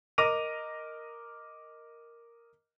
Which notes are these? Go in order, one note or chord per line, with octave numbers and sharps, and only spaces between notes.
A#4 D#5 D6 A#6 D#7 F7